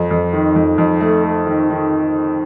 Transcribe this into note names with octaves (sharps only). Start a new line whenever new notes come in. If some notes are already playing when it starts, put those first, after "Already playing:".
Already playing: F2
F2
D#3
F2
F2
A3
A3
D#3
D#3